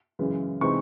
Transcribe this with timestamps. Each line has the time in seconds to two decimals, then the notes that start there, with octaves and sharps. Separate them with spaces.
0.19 F#2 C#3 E3 G#3
0.61 C3 E3 G#3 C4 D#4 C#6